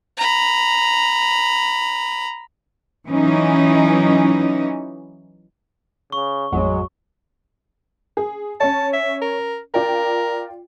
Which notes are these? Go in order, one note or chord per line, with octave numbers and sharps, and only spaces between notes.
A#5 B5
E3 F#3 C#4 D#4
C#3 C#6
A1 F2 F#3 G#3
G#4
C#4 C#5 A5
E5
A#4
F4 A#4 D5 G5